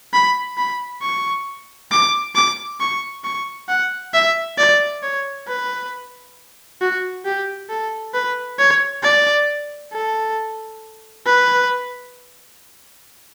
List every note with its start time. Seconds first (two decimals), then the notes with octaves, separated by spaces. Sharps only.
0.13 B5
0.57 B5
1.02 C#6
1.91 D6
2.35 D6
2.80 C#6
3.24 C#6
3.69 F#5
4.14 E5
4.58 D5
5.03 C#5
5.48 B4
6.81 F#4
7.25 G4
7.69 A4
8.14 B4
8.59 C#5
9.03 D5
9.93 A4
11.26 B4